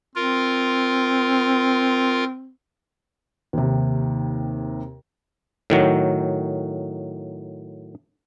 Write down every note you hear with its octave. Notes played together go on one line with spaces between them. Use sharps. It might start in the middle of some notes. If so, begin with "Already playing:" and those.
C4 F4 A#4
D#2 C3
A2 D#3 F#3